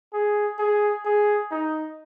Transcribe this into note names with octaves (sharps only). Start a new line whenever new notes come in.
G#4
G#4
G#4
D#4